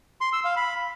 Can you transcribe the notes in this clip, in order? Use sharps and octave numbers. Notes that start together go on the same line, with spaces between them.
C6
E6
F5
B5